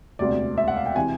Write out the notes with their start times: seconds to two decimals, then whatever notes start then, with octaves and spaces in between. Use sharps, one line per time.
0.19 E1 D2 C3 D5
0.58 E5
0.68 F#5
0.76 F5
0.86 G5
0.96 C3 E3 G#5